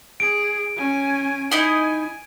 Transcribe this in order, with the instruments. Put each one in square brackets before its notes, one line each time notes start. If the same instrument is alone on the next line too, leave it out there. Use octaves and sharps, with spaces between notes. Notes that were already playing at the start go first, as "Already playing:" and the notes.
[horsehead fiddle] G#4 [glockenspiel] D7
[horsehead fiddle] C#4 G#5
[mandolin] D#4 E4 D#5 [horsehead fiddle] G#5